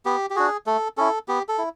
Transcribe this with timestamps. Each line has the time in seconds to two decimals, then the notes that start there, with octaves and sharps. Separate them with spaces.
0.05 B3 G4
0.30 G4
0.36 D4 F#4 G#4
0.66 A3 A4
0.97 C#4 E4 A4
1.28 B3 G4
1.49 A4
1.58 E4